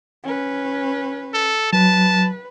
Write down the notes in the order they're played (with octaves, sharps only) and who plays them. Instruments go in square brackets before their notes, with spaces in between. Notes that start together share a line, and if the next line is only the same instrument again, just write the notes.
[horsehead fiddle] C#4 B4
[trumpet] A4
[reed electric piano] F#3 [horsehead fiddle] B4 [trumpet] A5